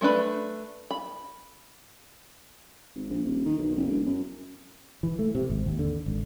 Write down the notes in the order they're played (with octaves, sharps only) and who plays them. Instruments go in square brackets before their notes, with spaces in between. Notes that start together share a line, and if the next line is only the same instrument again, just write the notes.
[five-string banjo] G#3 A3 D4 B4 B5
B5
[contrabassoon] G#1
A#1
D#1
D#3
B1
F#1
E1
F#2
[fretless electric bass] E3
A3
C3
G#1
D#2
D3
G#1